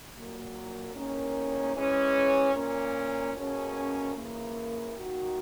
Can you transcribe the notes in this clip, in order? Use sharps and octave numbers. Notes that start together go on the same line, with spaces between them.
A#2 F#3 A#3
E2 D#3 A#3 C#4
E3 G#3 C#4 G#4
A#2 A#3 C#4
B2 A#3 C#4 G#4
C#3 E3 A#3
D#3 A#3 D#4 F#4